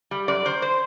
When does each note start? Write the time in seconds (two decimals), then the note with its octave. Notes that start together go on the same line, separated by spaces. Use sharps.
0.11 G3
0.28 F#2 D5
0.45 D#3 C5
0.62 C5